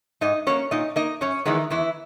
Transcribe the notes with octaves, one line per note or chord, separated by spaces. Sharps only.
G#2 D#4 D#5
F#3 A#3 C#4 C#5
A#2 D#4 D#5
A#3 D#4 D#5
F#2 C#4 C#5
D#3 E3 G#3 B3 D#4
E2 E3 E4